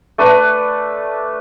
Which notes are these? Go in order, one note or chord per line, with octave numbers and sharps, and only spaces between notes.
A3 D4 B4